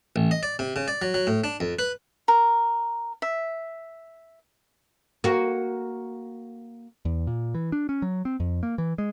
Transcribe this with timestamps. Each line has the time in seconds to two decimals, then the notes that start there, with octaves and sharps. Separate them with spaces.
0.16 A1
0.31 D#5
0.43 D5
0.59 C3
0.76 C#3
0.88 D5
1.02 F#3
1.14 F#3
1.27 A2
1.44 D4
1.60 F2
1.79 B4
2.28 A#4
3.22 E5
5.24 A#3 F#4
7.05 E2
7.27 A#2
7.55 E3
7.72 D4
7.89 C#4
8.02 F#3
8.25 C4
8.40 F2
8.63 A#3
8.78 E3
8.98 G#3